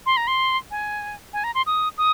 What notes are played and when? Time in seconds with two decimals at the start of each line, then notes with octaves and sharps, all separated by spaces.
0.06 C6
0.17 A#5
0.27 C6
0.71 G#5
1.33 G#5
1.44 A#5
1.55 C6
1.66 D#6
1.98 D#6